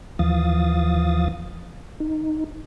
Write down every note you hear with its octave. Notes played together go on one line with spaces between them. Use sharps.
D#2 E3 F3 F5 D#6 A6
D#4